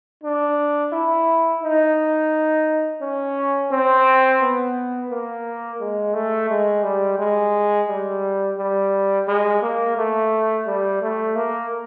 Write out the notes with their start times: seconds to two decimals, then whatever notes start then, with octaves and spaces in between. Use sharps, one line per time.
0.24 D4
0.92 E4
1.63 D#4
3.01 C#4
3.71 C4
4.41 B3
5.10 A#3
5.80 G#3
6.14 A3
6.49 G#3
6.84 G3
7.19 G#3
7.89 G3
8.57 G3
9.27 G#3
9.62 A#3
9.97 A3
10.66 G3
11.01 A3
11.36 A#3